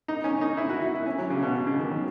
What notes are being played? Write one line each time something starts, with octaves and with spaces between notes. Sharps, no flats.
D#4
C#4
D#4
E4
F#4
E4
E4
C#4
F#3
C#3
B2
C#3
D#3
F#3